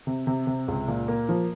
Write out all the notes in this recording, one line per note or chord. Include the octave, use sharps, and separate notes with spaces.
C3
C3
C3
C#2
A#2
A#3
F3